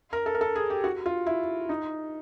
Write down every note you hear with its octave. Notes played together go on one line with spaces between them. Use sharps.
A#4
A4
A#4
A4
G#4
G4
F#4
F4
E4
D#4